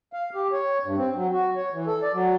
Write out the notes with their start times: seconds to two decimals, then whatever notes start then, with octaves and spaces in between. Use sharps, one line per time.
0.13 F5
0.35 G4
0.52 C#5
0.85 G2
0.98 C4
1.15 F#3
1.32 F#4
1.56 C#5
1.73 E3
1.87 A4
2.02 D5
2.14 F#3